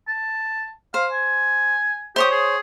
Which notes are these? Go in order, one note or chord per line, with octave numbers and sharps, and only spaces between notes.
A5
C5 F5
G#5
G4 C5 C#5 D#6
G#4